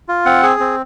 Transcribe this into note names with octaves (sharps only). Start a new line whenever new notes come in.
F4
C4 F#5
G#4
C4